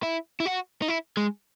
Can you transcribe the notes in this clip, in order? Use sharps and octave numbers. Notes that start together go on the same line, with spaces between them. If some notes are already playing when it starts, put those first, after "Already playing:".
E4
E4
F#4
D#4
E4
G#3